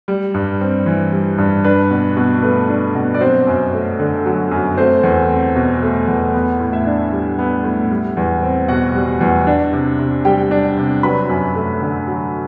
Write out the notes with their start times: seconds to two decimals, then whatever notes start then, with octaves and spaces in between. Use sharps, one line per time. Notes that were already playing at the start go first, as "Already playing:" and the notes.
0.08 G3
0.34 G2
0.61 C4
0.86 E3
1.12 G3
1.38 G2
1.64 D4 B4
1.91 B2
2.17 B2
2.43 A3 B4
2.69 D4
2.95 B2
3.14 D5
3.21 F#3 C4 C5
3.47 F#2
3.73 A3
3.99 D3
4.26 F#3
4.51 F#2
4.77 A3 C4 C5
5.03 E2
5.29 C4
5.56 B2
5.82 A3
6.08 E2
6.34 B3
6.60 A2
6.73 E4 E5
6.86 D4
7.12 G3
7.39 B3
7.64 A2
7.90 G3
8.17 E2
8.43 C4
8.68 B2 F#4 F#5
8.95 G3
9.21 E2
9.47 D4
9.73 C3
9.99 C3
10.25 G3 G4 G5
10.51 D4
10.77 C3
11.03 F#3 B4 B5
11.29 F#2
11.55 A3
11.82 D3
12.07 F#3